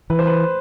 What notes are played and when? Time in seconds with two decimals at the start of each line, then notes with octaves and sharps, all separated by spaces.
0.10 E3 B4
0.19 C5
0.27 B4